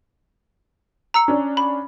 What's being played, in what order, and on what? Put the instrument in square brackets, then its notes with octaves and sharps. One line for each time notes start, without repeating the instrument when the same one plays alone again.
[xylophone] A#5 E6 C#7
[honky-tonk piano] C#4 D4
[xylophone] B5